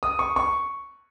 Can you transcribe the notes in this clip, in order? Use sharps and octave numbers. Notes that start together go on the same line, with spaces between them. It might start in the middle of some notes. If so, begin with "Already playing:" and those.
D#6
C#6
C#6